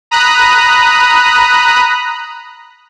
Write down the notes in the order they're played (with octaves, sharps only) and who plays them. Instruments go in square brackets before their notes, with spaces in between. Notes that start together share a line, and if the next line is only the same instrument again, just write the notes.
[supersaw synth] A#5 B5 D#6 F#6